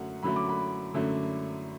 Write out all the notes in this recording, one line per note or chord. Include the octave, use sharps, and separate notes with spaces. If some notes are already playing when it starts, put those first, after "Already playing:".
Already playing: F#2 D3 F#3 A3 F#5
F#2 D3 F#3 A3 B5
D6
B5
F#2 D3 F#3 A3